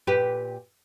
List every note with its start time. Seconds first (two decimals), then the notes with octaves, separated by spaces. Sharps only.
0.07 A#2 G4 B4